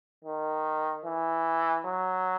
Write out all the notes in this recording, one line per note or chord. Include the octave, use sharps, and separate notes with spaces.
D#3
E3
F#3